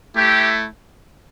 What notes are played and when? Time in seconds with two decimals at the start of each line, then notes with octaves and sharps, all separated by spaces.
0.16 A3 E4 G4